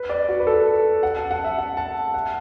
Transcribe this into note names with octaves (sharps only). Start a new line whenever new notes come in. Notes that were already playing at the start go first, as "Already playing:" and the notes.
Already playing: B4
D5
F#4
B4
A4
F#5
A5
F#5
E5
F#5
A5
F#5